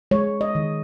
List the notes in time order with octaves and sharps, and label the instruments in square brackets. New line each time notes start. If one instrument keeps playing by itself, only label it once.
[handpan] G#3 C#5
D#5
D#3